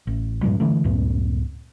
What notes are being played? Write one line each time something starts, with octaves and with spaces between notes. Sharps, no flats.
A1
G2 A#2 F3 G3
D3 E3 A3
C#2 F#2 A2 B3